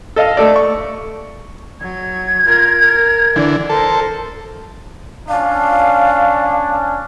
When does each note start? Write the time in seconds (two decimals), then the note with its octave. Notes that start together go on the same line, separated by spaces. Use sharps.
0.16 A4 D#5 F5
0.37 A3 A4 D5
0.56 C#6
1.81 F#3 G#6
2.46 F4 A#4
2.80 A#4
3.36 D3 E3 D5
3.70 A4 A#4 C5
5.29 C#4 D4 F5